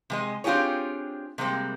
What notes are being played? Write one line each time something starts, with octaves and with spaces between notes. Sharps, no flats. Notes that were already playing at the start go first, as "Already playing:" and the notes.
C3 G#3 D#5
C4 D4 F4 G4 G#4 C#5
C3 G3 G#3 A#3 C4